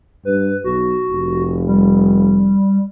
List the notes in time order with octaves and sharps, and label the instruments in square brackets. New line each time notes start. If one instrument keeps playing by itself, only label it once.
[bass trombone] G2 [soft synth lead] B4
[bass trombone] B1 [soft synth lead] F#4
[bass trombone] F1
[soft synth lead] G3